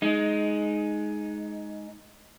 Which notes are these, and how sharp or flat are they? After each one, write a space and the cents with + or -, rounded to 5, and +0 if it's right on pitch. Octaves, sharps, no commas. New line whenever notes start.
G#3 +15 D#4 +0